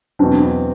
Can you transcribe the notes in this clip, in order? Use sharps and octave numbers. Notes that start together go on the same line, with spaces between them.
E2 B2 F#3 C4 D4